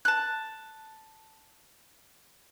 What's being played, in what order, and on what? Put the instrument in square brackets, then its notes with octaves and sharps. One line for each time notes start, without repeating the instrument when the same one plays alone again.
[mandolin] A5 F#6